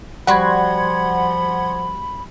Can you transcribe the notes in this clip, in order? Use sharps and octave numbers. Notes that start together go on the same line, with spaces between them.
F3 G3 F#4 F#5 B5 C6 G#6